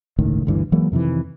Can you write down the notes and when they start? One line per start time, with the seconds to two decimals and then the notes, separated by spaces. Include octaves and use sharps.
0.18 G1 C#2 A2 D#3
0.45 G1 D2 G2 E3
0.72 E3 F#3 G#3 A#3
0.92 F2 C3 D#3 E3